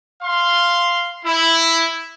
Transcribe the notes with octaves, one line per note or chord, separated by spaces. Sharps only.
F5 C6
E4